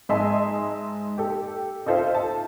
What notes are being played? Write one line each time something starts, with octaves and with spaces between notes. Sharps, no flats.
G#2 D#5 E5 G#5 A5 C6
G4 A4
D#4 F4 A4 C5 E5 F5
A5